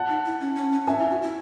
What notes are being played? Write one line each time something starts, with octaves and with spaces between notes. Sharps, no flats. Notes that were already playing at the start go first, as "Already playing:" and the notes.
Already playing: F#5 A5
D#4
E4
C#4
C#4
C#4
C#4 E5 G#5
E4
F#4
E4